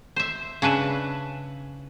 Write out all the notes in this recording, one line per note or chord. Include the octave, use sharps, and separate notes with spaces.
C5 E5
C#3 D4 B4 E5